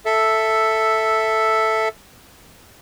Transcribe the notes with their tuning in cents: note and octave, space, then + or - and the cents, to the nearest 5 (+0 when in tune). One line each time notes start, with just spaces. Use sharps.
A4 +0 E5 +0